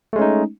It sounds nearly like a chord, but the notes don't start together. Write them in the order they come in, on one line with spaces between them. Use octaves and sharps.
A3 G#3 C#4 D#4